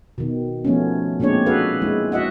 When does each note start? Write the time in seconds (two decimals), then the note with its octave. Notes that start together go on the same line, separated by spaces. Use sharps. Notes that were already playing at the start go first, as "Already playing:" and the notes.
0.18 B2 D#3
0.65 F3 A3 B3 C#4
1.20 A#2 G#3 C4 D4 C#5
1.46 F#4 G#4 A4 B4 F5
1.82 G#3 E4
2.12 F#4 D#5 E5 F#5